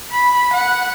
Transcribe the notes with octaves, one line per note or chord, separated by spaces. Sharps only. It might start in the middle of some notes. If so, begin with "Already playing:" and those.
B5
F#5